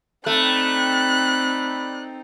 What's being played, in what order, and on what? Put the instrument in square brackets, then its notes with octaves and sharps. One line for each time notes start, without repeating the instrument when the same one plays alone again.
[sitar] A3 [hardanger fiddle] C4 D#4 [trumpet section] D5 G5 B5 [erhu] F#6